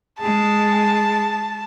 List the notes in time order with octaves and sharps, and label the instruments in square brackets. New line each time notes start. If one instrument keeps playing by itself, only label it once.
[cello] G#3 G#4 [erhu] A5